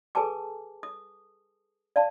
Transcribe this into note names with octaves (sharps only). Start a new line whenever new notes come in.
G#4 A4 B4 G#5 A5 D6
D#6
D5 F5 A5